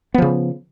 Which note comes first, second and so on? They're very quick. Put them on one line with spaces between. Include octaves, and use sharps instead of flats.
B3 F3 C#3